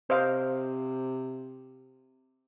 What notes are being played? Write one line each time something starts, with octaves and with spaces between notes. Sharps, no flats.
C3 C5 D#5 F5